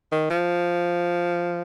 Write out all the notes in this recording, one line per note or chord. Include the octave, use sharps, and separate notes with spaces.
D#3
F3